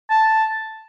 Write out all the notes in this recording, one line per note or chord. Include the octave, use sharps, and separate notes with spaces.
A5